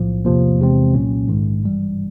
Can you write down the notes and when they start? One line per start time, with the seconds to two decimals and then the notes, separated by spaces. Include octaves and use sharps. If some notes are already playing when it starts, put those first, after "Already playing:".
Already playing: B1 A2 F3
0.25 E2 C3 F3 A#3
0.59 E2 C3 E3 G#3 C4
0.94 C2 A#2 F#3 A#3 C#4
1.28 A#1 G#2 D#3 G#3
1.63 G#1 G2 E3 G3